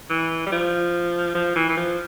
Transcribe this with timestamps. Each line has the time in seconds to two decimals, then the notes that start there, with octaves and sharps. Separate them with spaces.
0.09 E3
0.46 G3
0.52 F3
1.35 F3
1.55 E3
1.69 E3
1.77 F3